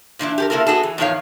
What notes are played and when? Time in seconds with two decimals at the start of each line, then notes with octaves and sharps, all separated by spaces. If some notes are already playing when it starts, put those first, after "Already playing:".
0.19 A#2 E3 D4 E4
0.38 G4 A4 A#4
0.50 C3 A#3 E4 A4 A#4
0.67 B3 F#4 G#4 A4
0.83 E3
0.98 E2 A2 D#3 F3 C#5 F5